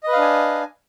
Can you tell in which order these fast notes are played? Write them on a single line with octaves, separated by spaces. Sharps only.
D#5 B4 F5 D4 G#5